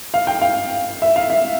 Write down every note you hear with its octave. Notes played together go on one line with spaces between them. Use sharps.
F5
G5
F5
E5
F5
E5